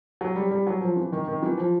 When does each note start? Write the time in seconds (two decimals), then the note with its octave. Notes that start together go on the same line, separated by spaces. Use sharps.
0.21 F#3
0.36 G3
0.51 G3
0.67 F#3
0.81 F3
0.97 E3
1.12 D#3
1.28 D#3
1.43 E3
1.58 F3